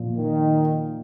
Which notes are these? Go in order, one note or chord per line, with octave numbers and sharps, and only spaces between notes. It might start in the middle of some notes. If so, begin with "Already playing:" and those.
Already playing: A#2 F3
D#3